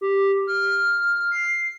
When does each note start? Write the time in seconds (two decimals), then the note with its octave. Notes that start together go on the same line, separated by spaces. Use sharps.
0.01 G4
0.47 F6
1.31 C7